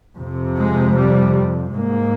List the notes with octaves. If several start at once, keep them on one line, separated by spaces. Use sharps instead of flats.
F2 C3
G#3
G3
G#2 A#3